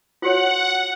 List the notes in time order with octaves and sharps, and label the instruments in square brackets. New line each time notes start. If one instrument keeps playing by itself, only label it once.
[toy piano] F4 F#4 C#5 [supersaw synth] F#5